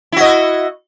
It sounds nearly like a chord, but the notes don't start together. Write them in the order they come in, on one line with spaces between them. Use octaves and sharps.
E4 F#4 D#5